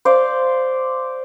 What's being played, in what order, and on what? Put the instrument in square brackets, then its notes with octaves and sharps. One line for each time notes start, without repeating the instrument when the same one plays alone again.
[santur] C5 D5 F5